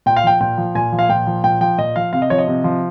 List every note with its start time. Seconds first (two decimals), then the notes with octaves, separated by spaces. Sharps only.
0.06 A#2 G5
0.17 F5
0.24 F3 G5
0.41 A#2 G5
0.58 F3
0.75 A#2 G#5
0.92 F3
0.99 F5
1.09 A#2 G5
1.27 F3
1.44 A#2 G5
1.61 F3 G5
1.78 A#2 D#5
1.96 F3 F5
2.13 C3 F5
2.22 D#5
2.30 F3 C#5
2.38 D#5
2.48 C3
2.64 F3